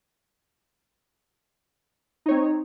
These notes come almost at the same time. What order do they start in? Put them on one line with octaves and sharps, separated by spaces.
D#4 C#5 C4